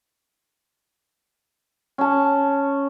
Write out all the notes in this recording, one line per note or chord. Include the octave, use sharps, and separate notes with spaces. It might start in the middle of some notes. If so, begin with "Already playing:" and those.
C#4 A5